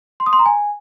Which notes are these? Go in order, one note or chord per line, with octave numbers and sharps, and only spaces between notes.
C6
D#6
C6
A#5
G#5